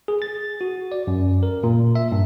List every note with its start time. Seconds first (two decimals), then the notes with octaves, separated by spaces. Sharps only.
0.08 G#4
0.22 A6
0.61 F#4
0.92 D5
1.07 F#2
1.43 A#4
1.64 A#2
1.95 E5
2.12 G2